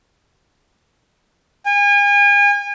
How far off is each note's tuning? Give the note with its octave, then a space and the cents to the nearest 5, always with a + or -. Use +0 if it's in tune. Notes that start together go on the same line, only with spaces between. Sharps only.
G#5 -35